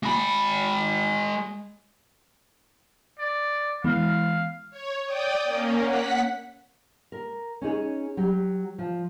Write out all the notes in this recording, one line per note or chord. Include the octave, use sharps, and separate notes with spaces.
G#3 B5
D5
E3 G#3 B3 F5
C#5
D5 G5 D#6
A#3 C#4
F#5 B6
A#4
C#4 D#4 G#4 C#5
F#3 G4
F3